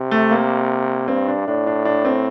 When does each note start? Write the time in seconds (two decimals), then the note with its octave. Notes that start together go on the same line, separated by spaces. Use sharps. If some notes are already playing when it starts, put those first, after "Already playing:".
Already playing: C3
0.11 A3
0.31 A#3
1.08 G2 C4
1.27 D4
1.48 A2 D4
1.67 D4
1.85 D4
2.05 C4